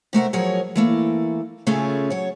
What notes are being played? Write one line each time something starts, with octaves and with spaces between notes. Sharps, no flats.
C3 A3 A#4 F#5
F3 F#3 G#4 A#4 C#5
E3 A3 A#3
C#3 A3 C#4 F4 G#4 A4
F#3 C#5